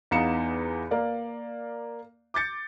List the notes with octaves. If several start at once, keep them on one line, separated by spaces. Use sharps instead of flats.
E2 B3 D#4 F5 C#7 E7
A#3 D5 F5
D6 G6 A6 C#7